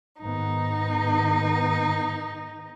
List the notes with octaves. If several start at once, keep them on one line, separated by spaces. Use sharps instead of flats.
G#2 D#3 B3 D#4